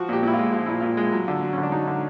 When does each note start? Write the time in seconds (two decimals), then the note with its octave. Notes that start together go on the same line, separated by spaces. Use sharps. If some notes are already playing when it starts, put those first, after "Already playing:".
Already playing: F3 F#4
0.09 A#2 G4
0.23 A#2 E4
0.33 F4
0.39 G#3
0.53 F3 F4
0.66 A#2 E4
0.80 A#2 F4
0.97 G#3
1.12 F#3
1.28 D3
1.43 F#3
1.53 C#4
1.58 D3
1.63 D4
1.72 F#3 D#4
1.87 D3